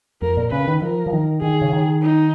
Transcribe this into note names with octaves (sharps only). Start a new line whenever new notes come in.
F2 A#4
A#2
C#3 B4
D#3
F3 A#4
F3
D#3
D#3 G#4
C#3
D#3
D#4